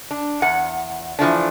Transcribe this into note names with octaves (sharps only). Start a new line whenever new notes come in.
D4
E2 F#5
E3 F3 A3 D4